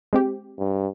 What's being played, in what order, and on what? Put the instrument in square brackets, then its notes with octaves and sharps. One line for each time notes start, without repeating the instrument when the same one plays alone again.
[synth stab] G#3 C4 G4
[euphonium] G2